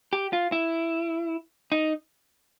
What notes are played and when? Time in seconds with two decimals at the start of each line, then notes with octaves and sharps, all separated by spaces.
0.13 G4
0.33 F4
0.52 E4
1.72 D#4